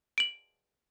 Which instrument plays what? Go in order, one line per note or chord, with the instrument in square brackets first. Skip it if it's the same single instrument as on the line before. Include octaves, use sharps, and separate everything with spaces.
[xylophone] D7 F#7